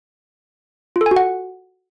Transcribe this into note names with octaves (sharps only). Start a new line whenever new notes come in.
F4
A4
G#5
F#4
F#5